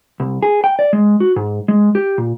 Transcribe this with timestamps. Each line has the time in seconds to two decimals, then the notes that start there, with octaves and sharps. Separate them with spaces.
0.20 C2
0.43 G#4
0.64 G5
0.79 D5
0.93 G#3
1.20 F#4
1.36 G#2
1.68 G#3
1.95 G4
2.18 A#2